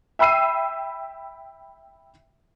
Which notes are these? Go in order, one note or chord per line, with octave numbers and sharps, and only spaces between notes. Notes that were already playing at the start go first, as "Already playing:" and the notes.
E5 G5 B5 E6 C7 D#7